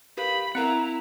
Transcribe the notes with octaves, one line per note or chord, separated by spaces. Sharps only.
G4 A#4 B4 F5 B5
C4 E4 A#4 E5 F#5 A#5